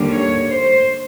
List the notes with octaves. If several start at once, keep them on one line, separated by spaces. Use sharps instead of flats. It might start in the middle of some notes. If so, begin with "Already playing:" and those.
Already playing: D#2 D3 G3 A#3
C#5
C5